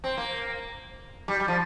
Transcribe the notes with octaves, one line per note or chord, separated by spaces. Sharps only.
C4
A#3
G3
G3
F3